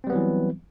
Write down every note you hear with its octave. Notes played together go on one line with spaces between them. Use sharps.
E3 F#3 G3 B3 C4